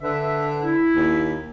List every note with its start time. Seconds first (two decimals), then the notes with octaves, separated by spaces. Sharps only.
0.01 D3 B4 E5
0.62 E4
0.95 D#2